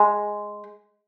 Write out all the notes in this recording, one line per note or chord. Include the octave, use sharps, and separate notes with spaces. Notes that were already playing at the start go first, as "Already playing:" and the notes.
Already playing: G#3